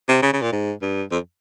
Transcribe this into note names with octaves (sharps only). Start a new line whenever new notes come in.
C3
C#3
C#3
A#2
G#2
G2
F2